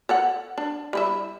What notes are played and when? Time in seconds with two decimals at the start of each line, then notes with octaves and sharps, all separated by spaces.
0.09 A4 C#5 F#5
0.58 D4
0.93 G3 E4 E5